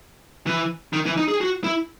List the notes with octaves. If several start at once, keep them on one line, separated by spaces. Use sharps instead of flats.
E3
D#3
E3
D#4
G#4
F#4
E4